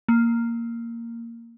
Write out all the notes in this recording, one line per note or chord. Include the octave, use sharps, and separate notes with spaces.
A#3